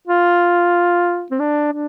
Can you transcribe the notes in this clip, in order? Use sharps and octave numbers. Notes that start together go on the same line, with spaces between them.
F4
C4
D4
D4